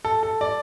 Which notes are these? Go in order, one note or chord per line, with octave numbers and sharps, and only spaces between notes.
A4
A4
D5